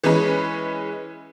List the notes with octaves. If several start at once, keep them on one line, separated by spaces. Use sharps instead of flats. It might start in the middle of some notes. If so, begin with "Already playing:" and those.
E3 G#3 C#4 G#4 B4